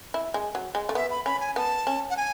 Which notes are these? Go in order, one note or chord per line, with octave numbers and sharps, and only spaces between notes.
E4
G#3
F#3
G#3
A3
B3 E5
B5
C#4 B5
G#5
B3 A5
C#4
F#5
G#5